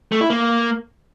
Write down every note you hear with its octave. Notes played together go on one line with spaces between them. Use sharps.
A3
E4
A#3